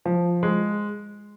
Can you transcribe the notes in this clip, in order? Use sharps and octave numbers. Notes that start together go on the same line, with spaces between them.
F3
G#3